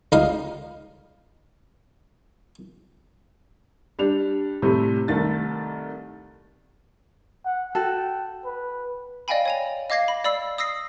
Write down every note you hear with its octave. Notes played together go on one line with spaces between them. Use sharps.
C#2 G3 D#4 F5 D#6
G3 D4 F7
A2 C3 G3 A3 C4
C2 D#3 A3 A6
F#5
F#4 A4 G5
B4
D5 D#5 F5 G5 G#5 B5
C#5 G#5 F7
D#5 F5 D6 G#6 A#6 C7
B5
D5 B5 E6 C7
D#6 E6 A#6 C7